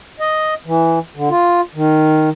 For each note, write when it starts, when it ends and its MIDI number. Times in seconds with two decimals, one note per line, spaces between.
0.20 0.54 75
0.66 0.99 52
1.16 1.29 50
1.30 1.61 65
1.75 2.29 51